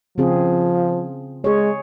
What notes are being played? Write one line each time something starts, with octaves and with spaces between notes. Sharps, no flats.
C#3 F3 C4 G#4
G#3 G#4 C#5